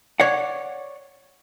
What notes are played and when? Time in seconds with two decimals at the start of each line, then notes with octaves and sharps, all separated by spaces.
0.20 C#5 D5 F#5